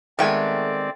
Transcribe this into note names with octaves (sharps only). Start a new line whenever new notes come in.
D#3 G#3 A3 B3 C4 D5 G5 G#5